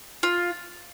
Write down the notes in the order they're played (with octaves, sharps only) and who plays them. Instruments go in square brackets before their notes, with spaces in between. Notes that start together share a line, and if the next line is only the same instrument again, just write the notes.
[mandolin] F4